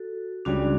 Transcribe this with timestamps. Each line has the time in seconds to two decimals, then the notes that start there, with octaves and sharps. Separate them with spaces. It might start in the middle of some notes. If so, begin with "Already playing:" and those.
Already playing: F#4 A4
0.45 C#2 C#3 G3 D4 F#4